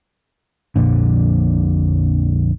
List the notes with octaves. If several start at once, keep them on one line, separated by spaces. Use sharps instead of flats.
A#1 F2 A#2 D3